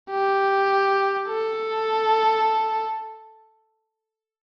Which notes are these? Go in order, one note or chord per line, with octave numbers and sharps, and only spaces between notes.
G4
A4